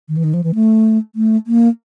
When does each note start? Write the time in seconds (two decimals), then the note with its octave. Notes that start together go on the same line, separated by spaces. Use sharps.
0.08 D#3
0.17 E3
0.24 D#3
0.34 F3
0.44 E3
0.55 A3
1.15 A3
1.47 A#3